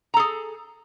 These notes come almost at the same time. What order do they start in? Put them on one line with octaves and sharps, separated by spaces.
A#5 A4 G#4